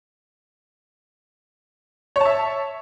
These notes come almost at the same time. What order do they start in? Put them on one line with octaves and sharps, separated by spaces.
C#5 A5 E5